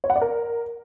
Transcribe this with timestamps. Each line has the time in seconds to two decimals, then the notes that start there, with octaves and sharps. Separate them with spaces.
0.04 C#5
0.10 F#5
0.16 D5
0.22 A#4